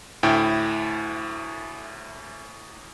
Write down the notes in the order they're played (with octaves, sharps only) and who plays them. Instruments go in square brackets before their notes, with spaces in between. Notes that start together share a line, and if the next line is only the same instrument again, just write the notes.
[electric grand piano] D2 A2 E4 G5